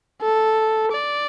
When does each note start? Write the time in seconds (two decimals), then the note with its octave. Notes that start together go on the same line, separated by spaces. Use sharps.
0.21 A4
0.92 D5